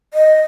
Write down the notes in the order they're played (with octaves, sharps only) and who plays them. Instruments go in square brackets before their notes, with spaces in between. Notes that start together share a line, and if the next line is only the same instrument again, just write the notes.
[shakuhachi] D#5